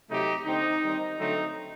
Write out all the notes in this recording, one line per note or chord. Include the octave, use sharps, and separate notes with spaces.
C3 F#3 A3 D#4 G4
D3 A3 C4 D#4
D#3 G3 C4
D3 F#3 A3 C4 D#4